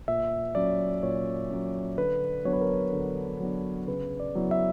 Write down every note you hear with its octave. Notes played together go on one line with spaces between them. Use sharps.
A#2 E5
F#3 C#4 D5
A#2 C#5
F#3 C#4
D3 B4
F#3 B3 D4 C#5
B4
A#4
D3
F#3 B3 D4
C#3 B4
D5
F#3 B3 E4
E5